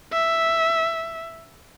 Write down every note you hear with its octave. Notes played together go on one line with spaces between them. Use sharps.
E5